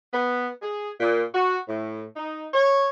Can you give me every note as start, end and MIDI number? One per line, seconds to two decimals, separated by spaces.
0.12 0.47 59
0.61 0.89 68
1.00 1.22 46
1.33 1.55 66
1.67 2.04 45
2.15 2.46 63
2.52 2.90 73